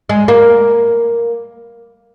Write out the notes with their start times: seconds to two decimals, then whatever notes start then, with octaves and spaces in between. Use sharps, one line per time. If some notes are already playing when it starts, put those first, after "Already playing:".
0.09 G#3
0.28 A#3